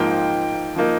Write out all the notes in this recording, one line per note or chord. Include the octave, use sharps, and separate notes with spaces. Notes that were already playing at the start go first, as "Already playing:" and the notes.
Already playing: G#2 F3 A#3 D#4 G5
F3 A#3 D#4